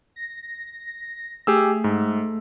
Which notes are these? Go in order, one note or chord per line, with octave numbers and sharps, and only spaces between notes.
A#6
A3 G4 G#4 E6
G#2